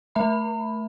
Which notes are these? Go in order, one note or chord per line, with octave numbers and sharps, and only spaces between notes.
A3 E5 B5